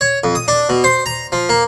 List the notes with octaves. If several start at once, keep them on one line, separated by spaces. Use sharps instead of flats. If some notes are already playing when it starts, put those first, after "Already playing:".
C#5
F2
D#6
D4
B2
C5
A#5
F3
A#3